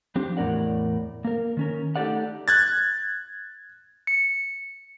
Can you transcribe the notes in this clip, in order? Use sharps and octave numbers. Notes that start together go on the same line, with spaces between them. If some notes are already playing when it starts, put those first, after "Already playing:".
F3 C4 D4 G4
E2 A2 A3 A#4 D5 F#5
A#3 A#4
D#3 C#4 A#4
A3 D#4 G4 A4 D5 F#5
F#6 G#6 A6
C#7